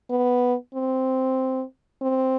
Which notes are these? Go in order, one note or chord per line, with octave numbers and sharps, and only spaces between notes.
B3
C4
C4